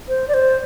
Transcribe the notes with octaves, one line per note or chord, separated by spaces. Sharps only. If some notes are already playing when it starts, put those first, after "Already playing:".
C5
D5
C5